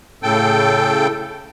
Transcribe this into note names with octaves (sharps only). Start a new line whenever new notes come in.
A2 C#3 A4 G5